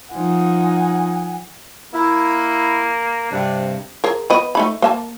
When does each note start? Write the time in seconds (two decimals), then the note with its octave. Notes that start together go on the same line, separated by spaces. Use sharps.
0.13 F3 D#4 F#5 G#5
1.94 A#3 E4
3.32 G2 C3 D4
4.04 G#4 A#4
4.30 B3 D#5 B5
4.55 A3 D#4 B5
4.82 A#3 E5 A5